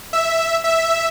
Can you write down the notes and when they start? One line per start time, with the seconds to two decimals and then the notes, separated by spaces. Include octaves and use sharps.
0.13 E5
0.64 E5